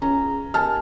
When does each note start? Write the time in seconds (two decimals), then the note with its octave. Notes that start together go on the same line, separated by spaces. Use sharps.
0.02 C#2 C#4 G#4 A#5
0.54 D#2 G#5 A5 F6